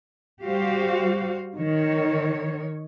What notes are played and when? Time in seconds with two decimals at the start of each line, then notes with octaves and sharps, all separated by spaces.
0.43 G3 F#4 G4 C5 F5
1.57 D#3 C#5